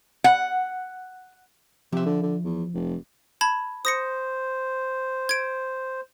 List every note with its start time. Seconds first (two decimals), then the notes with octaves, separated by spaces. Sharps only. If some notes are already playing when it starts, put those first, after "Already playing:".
0.24 F#5
1.92 C3 F3 E5
2.06 D3
2.23 D3
2.44 E2
2.74 F1
3.41 A5 B5 G#6
3.85 C5 D#6 A#6 C#7
5.29 G#6 D7